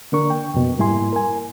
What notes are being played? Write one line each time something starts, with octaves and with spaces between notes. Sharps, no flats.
D3 A#3 D4 A#4 C#6
G5
F2 B2
G#2 G3 A#3 E4 G#5 C6
A#4 G#5